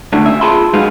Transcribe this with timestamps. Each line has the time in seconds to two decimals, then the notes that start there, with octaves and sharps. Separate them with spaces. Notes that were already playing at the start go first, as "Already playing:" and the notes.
0.13 D3 A3 D4 E4
0.25 C#3 E5
0.41 F4 G#4 A5 B5 C6
0.74 F#3 G#3 D#4 G#4 B4 F5